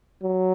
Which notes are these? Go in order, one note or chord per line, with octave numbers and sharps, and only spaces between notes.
F#3